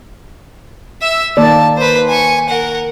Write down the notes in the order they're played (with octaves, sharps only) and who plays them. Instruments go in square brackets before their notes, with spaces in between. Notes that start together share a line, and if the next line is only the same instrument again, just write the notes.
[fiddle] E5 E6
[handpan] D#3 A#3 D5 [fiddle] A5
[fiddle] B4 C5
G#5 C#6
A#4 F#5